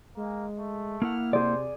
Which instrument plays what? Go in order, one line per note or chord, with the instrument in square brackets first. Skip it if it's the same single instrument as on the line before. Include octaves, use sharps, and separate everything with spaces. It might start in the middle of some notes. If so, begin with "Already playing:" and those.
[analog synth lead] G#3 [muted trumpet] A#3
[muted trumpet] A3
[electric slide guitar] A#3 E4 F#5 [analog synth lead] F6
[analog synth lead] C3 [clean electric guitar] G#4 D5 [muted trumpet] C5